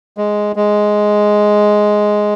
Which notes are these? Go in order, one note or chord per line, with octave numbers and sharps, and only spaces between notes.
G#3
G#3